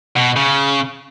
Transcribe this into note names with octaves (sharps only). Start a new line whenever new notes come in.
B2
C#3